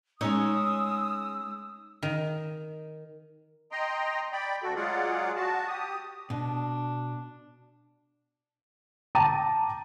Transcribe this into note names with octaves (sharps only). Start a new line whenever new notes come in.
G#3 C#4 D#4 C#5 D#6 E6
D#3
D#5 G5 A#5 C6
D5 G5 B5
D2 F#4 A4
F#3 G#3 F4 G#4 D5 F#5
F#4 A5
G4 D#6
B2 D4
G5 A5 A#5 D6 D#7